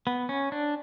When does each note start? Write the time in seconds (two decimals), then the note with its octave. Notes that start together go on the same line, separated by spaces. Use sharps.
0.07 B3
0.29 C#4
0.52 D4